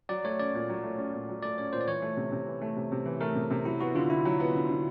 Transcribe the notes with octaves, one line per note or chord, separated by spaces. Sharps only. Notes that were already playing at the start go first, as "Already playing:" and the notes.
F#3 D5
A3 C#5
C#4 D5
A#2
F#3
A3
C#4
A#2
F#3
A3 D5
C#4 C#5
A#2 C5
D5
E3 C#5
A3
C3
C3
E3
A3
C3
C3
E3
A3 A#4
C3
C3
F#3 E4
B3 F#4
D3 F4
D3 E4
F#3
B3
D3
D3